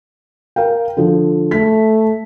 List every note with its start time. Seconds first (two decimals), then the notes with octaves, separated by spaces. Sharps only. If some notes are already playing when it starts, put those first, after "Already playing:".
0.56 A#4 F5 G5
0.97 D3 F3
1.51 A3 B6